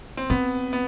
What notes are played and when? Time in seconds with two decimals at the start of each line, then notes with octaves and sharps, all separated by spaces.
0.17 C4
0.30 B3 C4
0.73 B3